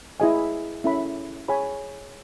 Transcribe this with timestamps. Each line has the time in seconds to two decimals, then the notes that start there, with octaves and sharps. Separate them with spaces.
0.20 E4 G#4 D#5 G#5
0.84 C#4 E4 A4 E5 B5
1.48 G#4 C#5 G#5 B5